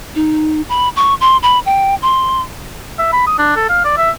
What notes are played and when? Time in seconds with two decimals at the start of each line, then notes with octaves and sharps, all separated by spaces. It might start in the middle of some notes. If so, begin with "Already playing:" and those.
0.16 D#4
0.69 B5
0.96 C#6
1.21 C6
1.43 B5
1.66 G5
2.02 C6
2.99 E5
3.13 B5
3.27 D#6
3.39 D4
3.56 A4
3.69 F5
3.85 D5
3.97 E5